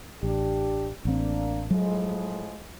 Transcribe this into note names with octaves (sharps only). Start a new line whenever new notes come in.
A1 D4 G4
A1 A#3 C4 D4
A2 F3 F#3 G#3